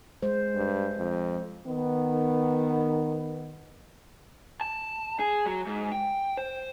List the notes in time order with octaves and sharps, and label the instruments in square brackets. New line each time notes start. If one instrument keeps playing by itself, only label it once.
[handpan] G#3 C5
[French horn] G2
F2
[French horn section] D#3 B3
[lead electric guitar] A5
G#4
F#3
G#2
G5
C5